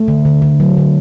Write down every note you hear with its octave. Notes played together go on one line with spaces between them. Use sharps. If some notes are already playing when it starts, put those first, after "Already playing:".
Already playing: A3
D3
D3
D3
F#3
D3